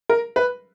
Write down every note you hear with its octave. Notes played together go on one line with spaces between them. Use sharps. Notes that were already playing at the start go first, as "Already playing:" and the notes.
A#4
B4